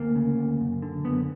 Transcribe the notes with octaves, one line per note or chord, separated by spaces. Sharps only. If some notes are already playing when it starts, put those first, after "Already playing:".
Already playing: D2 A#3
C#3
D2
F#2
D3
F#2 B3